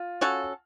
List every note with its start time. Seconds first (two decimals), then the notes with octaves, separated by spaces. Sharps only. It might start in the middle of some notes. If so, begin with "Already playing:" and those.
Already playing: F4
0.21 C#4 F#4 A4